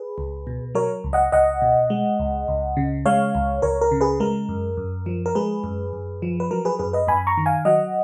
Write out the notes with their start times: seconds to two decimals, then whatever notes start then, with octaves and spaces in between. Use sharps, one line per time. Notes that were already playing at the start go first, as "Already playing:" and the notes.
Already playing: G#4 B4
0.18 C#2
0.47 B2
0.75 F#3 A#4 C#5
1.04 C#2
1.13 D#5 F#5
1.32 C#2 D#5 F#5
1.62 B2
1.90 G#3
2.19 C#2
2.48 C#2
2.77 C#3
3.06 G#3 C#5 F5
3.35 C#2
3.62 C#2 A#4 C#5
3.81 A#4
3.91 C#3
4.01 G#4 B4
4.20 G#3 A#4
4.49 F#2
4.77 F#2
5.06 F3
5.26 A#4
5.35 G#3 G#4 B4
5.64 F#2
5.93 F#2
6.22 F3
6.40 B4
6.51 F#3 A#4
6.65 G#4 B4
6.79 F#2 G#4 B4
6.93 B4 D#5
7.07 F#2 G#5 B5
7.27 A#5 C#6
7.37 D#3
7.46 F5 G#5
7.65 F#3 D#5 F#5